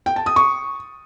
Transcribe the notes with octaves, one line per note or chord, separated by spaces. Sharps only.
G5
A5
D#6
C#6